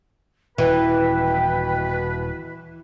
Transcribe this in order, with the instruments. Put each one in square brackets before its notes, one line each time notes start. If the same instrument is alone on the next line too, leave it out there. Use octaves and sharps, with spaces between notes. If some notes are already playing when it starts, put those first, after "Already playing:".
[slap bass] D#1 [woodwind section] B2 B4 [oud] E3 [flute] G5